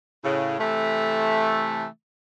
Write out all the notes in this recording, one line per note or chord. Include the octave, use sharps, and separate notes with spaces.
A2 C#3
C3 E3 A3